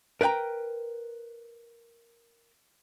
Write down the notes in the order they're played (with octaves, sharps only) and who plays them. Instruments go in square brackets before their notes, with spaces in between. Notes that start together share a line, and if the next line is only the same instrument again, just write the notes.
[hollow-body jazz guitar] A#4 B4 D5 G5 A#5